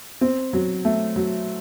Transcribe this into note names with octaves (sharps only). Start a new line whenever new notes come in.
C4
F#3
A3
F#3